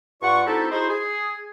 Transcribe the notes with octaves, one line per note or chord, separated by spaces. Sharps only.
G2 F4 D5 F#5 C#6
C4 D#4 E4 F#4 G4 A4
D#4 E4 F#4 G#4 C5
G#4